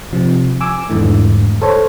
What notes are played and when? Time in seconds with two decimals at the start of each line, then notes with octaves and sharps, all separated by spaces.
0.13 C3 F3
0.61 G#5 D6 E6
0.89 E2 G#2 D3 E3 A3
1.62 A4 C5 C#5